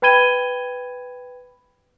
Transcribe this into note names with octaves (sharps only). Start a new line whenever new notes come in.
B4 G5 B5 G#6 D#7 G7